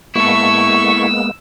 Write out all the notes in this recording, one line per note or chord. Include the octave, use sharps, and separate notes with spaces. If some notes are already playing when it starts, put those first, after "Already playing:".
G#3 A#3 B3 E4 A4 C#6 E6